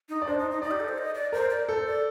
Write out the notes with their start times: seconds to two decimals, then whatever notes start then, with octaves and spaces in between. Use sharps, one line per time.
0.09 D#4
0.22 D5
0.27 D4 C5
0.39 D#4
0.51 D#4
0.62 D#4 D5
0.71 G4
0.80 A4
0.88 C5
0.98 D#5
1.15 D5
1.33 A#4 C5
1.50 D5
1.69 A4 C5
1.86 D5